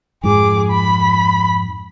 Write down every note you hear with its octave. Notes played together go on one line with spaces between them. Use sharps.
F2 G#2 F3 G#4 D6
B5